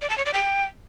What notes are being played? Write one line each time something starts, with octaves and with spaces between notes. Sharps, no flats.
D5
A5
C#5
D5
G5